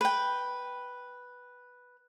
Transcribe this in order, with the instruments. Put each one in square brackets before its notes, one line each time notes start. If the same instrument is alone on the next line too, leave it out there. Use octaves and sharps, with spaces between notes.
[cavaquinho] B4 G5